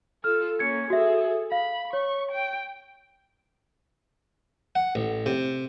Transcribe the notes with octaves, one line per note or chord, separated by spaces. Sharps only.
F4 A4 F6
A#3 C#4 G#6 C#7
F#4 G#4 A4 E5
F5 B5
C#5 C#6
G5
F#5
A1
C3